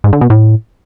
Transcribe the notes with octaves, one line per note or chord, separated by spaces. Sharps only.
G#2
D3
B2
A2